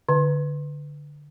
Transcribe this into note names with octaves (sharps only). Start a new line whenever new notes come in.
D3